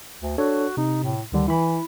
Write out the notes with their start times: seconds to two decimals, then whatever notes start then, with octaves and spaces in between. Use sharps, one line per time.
0.21 D2
0.38 D4 F#4 A4 C#5
0.77 C3 D#4
1.03 A2
1.32 D2 D3 D#3 G3
1.48 E3 E4 B5